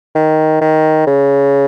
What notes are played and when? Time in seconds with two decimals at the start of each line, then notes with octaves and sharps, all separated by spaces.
0.15 D#3
0.61 D#3
1.07 C#3